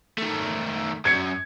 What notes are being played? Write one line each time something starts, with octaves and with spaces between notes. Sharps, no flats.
D#3 A3
F#2 G#6 C#7